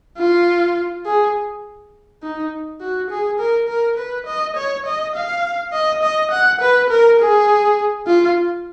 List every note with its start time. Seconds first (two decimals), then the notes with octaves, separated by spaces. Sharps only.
0.18 F4
1.06 G#4
2.23 D#4
2.81 F#4
3.10 G#4
3.39 A#4
3.68 A#4
3.98 B4
4.26 D#5
4.56 C#5
4.86 D#5
5.15 F5
5.73 D#5
6.02 D#5
6.31 F#5
6.61 B4
6.90 A#4
7.19 G#4
8.07 F4